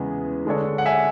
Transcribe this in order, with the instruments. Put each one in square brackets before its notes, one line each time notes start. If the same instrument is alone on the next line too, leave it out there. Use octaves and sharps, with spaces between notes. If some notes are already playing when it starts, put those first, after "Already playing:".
Already playing: [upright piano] E2 C#3 G#3 B3 [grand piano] G#5
[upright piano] D3 G#3 D4 A4 C#5
[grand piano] F#5
E5 G#5